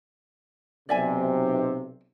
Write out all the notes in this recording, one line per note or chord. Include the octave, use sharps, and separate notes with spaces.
B1 C3 D5 E5 G#5